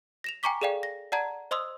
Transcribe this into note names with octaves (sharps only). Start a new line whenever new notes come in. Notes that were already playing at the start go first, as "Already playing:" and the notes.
A#6 E7 F7
G5 G#5 A#5 C#6 D6 B6
G#4 A4 D5 F5 G5
A#6
D5 F#5 A5 A#5 G#6
C5 D#5 C6 D#6 E6